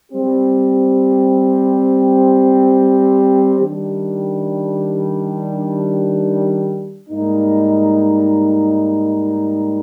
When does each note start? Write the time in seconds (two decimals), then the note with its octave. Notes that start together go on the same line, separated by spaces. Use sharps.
0.11 G3 C4 G4
3.60 D#3 G3 D4
7.08 G#2 G3 A#3 D#4